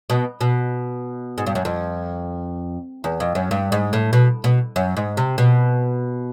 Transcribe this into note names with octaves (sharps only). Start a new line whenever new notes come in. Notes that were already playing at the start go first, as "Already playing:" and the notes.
B2
B2
G#2
G2
F#2
F2
E2
F2
F#2
G2
G#2
A2
B2
B2
F#2
G#2
C3
B2